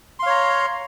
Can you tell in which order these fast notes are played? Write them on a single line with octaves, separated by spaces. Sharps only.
C6 F5 C#5 A#5